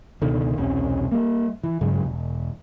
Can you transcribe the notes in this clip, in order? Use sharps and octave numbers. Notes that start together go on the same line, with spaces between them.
C#2 B2 D3 D#3
E1 C2 C3 C#4
G3 A#3
E3
G2 C#3 F#3 G#3
E1